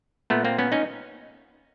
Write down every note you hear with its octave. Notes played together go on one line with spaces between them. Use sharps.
A#2 A3 B3
A#3 C4
B3 C#4
C#4 D#4